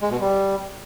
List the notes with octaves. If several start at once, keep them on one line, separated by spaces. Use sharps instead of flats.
G#3
B2
G3